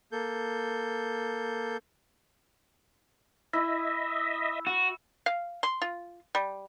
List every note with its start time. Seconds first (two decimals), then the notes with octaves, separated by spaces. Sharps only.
0.12 A#3 A4 G6
3.53 E4 D#5 E5
4.67 F#4
5.26 F5
5.63 C6
5.82 F4
6.35 G3